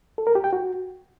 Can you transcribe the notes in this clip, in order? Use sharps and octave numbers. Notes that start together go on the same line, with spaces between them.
A4
A#4
G4
G5
F#4